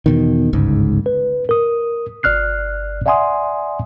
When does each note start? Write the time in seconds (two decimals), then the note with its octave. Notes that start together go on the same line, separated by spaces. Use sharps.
0.06 E2 B2 D#3
0.53 G1 C#2 G#2
1.06 B4
1.49 A#4 D#6
2.23 G1 D5 F6 F#6 C7
3.06 D5 E5 F#5 G#5 C6 D#6